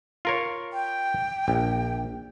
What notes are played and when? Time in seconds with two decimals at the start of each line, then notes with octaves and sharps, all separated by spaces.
0.25 F4 A#4 C#5
0.73 G5
1.48 A#1